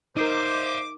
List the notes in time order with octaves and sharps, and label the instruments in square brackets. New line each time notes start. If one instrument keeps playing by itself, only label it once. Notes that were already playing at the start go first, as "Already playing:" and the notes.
[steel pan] D#4 A#4 [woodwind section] C5 [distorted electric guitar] D#5 E5 [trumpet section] D6